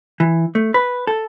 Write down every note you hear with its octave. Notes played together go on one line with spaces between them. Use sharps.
E3
A3
B4
A4